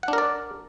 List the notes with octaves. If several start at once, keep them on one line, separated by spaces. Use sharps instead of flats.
D4 A#4 D5 F#5